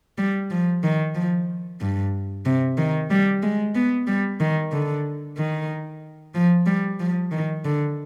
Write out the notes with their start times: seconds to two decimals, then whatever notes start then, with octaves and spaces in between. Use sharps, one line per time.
0.18 G3
0.51 F3
0.84 D#3
1.15 F3
1.81 G2
2.46 C3
2.78 D#3
3.10 G3
3.43 G#3
3.75 B3
4.07 G3
4.40 D#3
4.72 D3
5.38 D#3
6.34 F3
6.66 G3
7.00 F3
7.32 D#3
7.65 D3